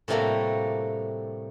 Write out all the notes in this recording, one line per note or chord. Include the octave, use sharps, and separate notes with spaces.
A2 C3 G3 A3 A#3 F#4